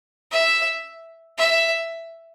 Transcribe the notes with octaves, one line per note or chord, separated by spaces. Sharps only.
E5
E5